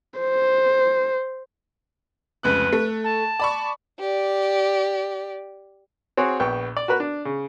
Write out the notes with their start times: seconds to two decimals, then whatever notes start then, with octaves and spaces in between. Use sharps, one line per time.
0.20 C5
2.43 F1 C#2 B4 F#6
2.73 A3
3.04 A5
3.40 D5 B5 C#6
4.00 G4 D5
6.17 C4 F#4 G#4 C#5
6.40 A#1 B3 G5 C#6
6.77 D5
6.88 F#4 A#4 B4 B5
7.00 D4
7.25 C#3